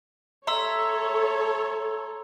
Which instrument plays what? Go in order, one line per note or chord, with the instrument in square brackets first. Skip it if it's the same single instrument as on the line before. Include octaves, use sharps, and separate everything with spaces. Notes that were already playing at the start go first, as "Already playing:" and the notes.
[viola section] A4 C#5 [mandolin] E5 [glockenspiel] A#5 C6 E6